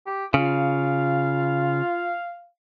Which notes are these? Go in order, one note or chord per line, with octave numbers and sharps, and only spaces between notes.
G4
C#3 F4 F5